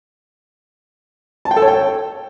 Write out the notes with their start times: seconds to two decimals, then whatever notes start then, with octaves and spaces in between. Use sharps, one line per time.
1.45 A5
1.51 G5
1.57 A4
1.62 C#5
1.68 G5